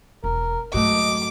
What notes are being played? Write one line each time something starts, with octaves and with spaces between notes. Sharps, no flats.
E1 A#4
G#2 F#3 A3 F#4 D#5 D6